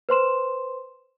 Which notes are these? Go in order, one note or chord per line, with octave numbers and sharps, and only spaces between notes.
B4 C5 C6 E7